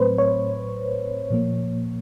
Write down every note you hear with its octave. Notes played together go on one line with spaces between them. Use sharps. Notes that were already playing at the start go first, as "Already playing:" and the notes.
Already playing: A2 F#3 A3 C4 B4 C5
C#5
A#2 F3 A#3